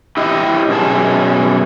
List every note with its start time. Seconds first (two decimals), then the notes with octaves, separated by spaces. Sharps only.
0.17 E4 G4 D#5
0.69 F#2 B2 G#4 A5